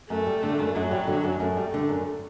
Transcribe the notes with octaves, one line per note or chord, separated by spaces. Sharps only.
F#2 A3
G3
D3
F#2
F#2 F#3
G3
D3
F#2
F#2 A3
G3
D3
F#2